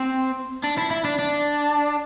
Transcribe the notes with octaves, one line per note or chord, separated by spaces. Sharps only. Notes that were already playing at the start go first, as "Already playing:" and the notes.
Already playing: C4
D4
E4
E4
D4
D4